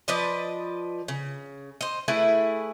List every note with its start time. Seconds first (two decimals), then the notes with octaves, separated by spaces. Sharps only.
0.08 F3 B4 D5 D#5
1.08 C#3
1.81 C5 D#5
2.08 A3 E4 G#4 B4